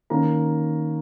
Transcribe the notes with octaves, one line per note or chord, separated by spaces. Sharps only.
D#3 A#3 C#4 A#5